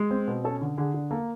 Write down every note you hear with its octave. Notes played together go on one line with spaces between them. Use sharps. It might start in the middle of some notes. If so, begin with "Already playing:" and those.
Already playing: G#3
C4
B2
C#4 A4
D3
D3 G#4
D3
A#3 A4